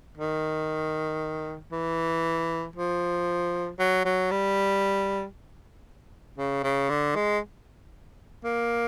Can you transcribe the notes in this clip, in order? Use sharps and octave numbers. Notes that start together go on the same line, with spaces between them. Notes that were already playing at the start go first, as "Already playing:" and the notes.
D#3
E3
F3
F#3
F#3
G3
C#3
C#3
D3
G#3
A#3